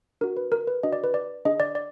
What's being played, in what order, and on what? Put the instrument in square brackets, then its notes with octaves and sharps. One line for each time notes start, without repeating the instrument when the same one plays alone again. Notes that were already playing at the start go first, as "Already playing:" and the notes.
[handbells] D4 F#4 A#4
B4
A#4
B4
D4 F#4 D#5
D5
B4
D5
D4 G#4 D#5
D5
D5